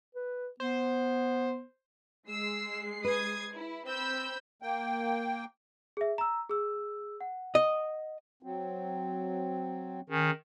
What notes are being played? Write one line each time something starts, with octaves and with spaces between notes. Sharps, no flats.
B4
B3 C5
G#3 E6 C7
B4 D#6 G#6
E4
C4 B5 E6 G6
A#3 G5
G#4 E5
A#5 E6
G#4 E6
F#5
D#5
F#3 C4
D#3 C#4 G#4